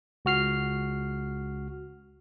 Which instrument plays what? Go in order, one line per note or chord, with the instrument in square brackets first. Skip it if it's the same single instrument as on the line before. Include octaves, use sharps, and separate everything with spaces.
[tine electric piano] C#2 F#4 F6 C7